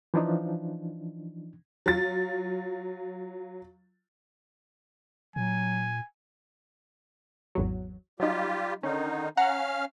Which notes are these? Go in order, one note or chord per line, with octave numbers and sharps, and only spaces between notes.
E3 F3 D4 D#4
F#3 F4 A6
A#2 F#3 G#5
G#1 E2 F#3
F#3 G3 D#4 F4 G4
D3 D#3 C#4 D#4
C#4 F5 F#5 A#5 F6